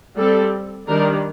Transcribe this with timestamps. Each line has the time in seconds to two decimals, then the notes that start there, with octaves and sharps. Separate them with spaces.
0.17 G3 C4 A4
0.88 D#3 G3 D4 A#4